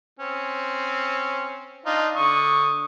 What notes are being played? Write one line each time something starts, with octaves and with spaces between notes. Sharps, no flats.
C4 C#4
D4 D#4 F4
D3 C#6 D#6